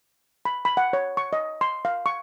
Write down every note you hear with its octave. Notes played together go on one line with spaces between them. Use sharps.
B5
B5
F#5
C#5
C#6
D#5
C6
F5
C#6